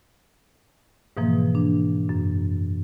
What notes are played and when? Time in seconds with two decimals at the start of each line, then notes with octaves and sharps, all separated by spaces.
1.17 G#2 B2 E3 F3 A#3
1.55 D4
2.09 F#2